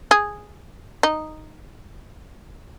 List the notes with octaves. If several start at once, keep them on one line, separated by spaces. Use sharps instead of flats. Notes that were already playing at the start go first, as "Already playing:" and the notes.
G#4
D#4